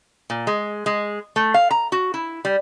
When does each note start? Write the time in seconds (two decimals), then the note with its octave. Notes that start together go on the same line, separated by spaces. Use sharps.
0.30 A#2
0.47 G#3
0.86 G#3
1.36 A3
1.54 F5
1.71 A#5
1.92 F#4
2.14 E4
2.45 G3